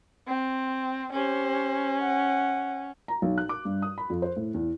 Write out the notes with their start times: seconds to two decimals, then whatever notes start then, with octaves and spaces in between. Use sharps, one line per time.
0.28 C4
1.13 C#4 G4 C5
2.01 F#5
3.08 A#5
3.22 B1
3.38 F#6
3.49 D6
3.65 G2
3.82 D#6
3.98 B5
4.10 F2
4.22 C5
4.37 A2
4.54 E2